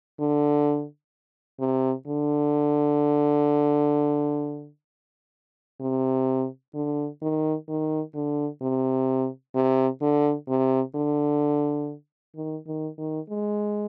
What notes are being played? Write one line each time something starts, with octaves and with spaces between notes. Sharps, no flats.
D3
C3
D3
C3
D3
D#3
D#3
D3
C3
C3
D3
C3
D3
D#3
D#3
D#3
G#3